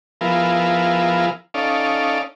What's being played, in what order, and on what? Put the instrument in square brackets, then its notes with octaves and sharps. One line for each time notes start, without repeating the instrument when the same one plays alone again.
[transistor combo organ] F3 B3 E4 F4 G#4 A#4
C#4 D#4 A4 D5 F5